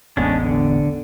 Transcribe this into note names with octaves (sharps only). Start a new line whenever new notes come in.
E1 A1 G#3 B3 C#4 D4
D3